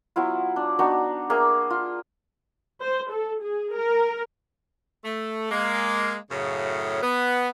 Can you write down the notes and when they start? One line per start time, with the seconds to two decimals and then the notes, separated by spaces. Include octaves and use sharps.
0.16 F#3 B3 E4 F4
0.56 D4
0.79 B3 D4 D#4 F#4
1.30 A#3 G#4 E5
1.70 F4
2.82 C5
3.12 A4
3.43 G#4
3.76 A#4
5.05 A3
5.51 G#3 A#3
6.31 F#2 A2 C#3
7.03 B3